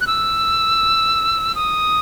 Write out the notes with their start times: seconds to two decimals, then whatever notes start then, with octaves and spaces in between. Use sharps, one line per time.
0.01 F#6
0.07 E6
1.55 D#6